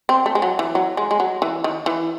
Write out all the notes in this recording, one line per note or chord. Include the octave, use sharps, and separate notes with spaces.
C4
A3
G#3
F#3
E3
F#3
G#3
G#3
F#3
E3
D#3
E3